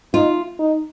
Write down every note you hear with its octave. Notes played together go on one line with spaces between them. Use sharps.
D#4 F4
D#4